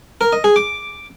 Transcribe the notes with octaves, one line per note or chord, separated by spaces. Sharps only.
A#4
D#5
G#4
D6